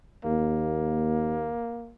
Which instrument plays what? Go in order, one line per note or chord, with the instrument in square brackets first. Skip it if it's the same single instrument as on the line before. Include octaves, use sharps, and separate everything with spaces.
[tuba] D#2 [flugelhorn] A#3